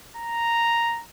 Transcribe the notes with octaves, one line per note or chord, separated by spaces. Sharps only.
A#5